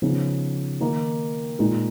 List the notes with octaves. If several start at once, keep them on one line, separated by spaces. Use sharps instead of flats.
C#3 F3 B3 D#4
D#3 A#3 D#4
A#2 G#3 D#4